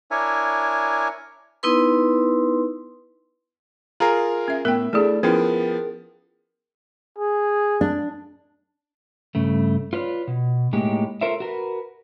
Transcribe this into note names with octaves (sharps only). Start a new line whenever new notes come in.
D4 E4 A#4 C#5 E5 G#5
B3 D#4 E4 B4 C6
F4 G#4 A#4 A#5
C#4 E5
A2 B3 A#4 E5 G5
A3 D4 E4 G#4 A4 D5
F3 B3 C#4 E4 G#4 A#4 G5
G#4
D4
G2 C#3 A3
F4 B4 C#5 D5
B2
A2 G#3 A#3 D#4 G4
F4 A4 A#4 C5 C#5 E5
F#4 A#4 B4